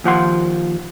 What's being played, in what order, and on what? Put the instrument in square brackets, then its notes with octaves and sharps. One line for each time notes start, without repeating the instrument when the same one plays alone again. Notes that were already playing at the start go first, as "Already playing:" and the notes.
[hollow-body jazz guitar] D#2 F3 F#5 C6